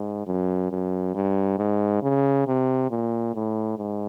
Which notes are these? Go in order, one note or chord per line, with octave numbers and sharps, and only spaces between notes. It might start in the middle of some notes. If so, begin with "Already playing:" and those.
Already playing: G#2
F#2
F#2
G2
G#2
C#3
C3
A#2
A2
G#2